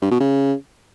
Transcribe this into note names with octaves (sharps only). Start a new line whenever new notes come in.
G2
B2
C#3